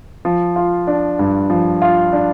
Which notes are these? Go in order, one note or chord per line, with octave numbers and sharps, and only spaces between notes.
F3
F4
D4
G2
F3
F4
D4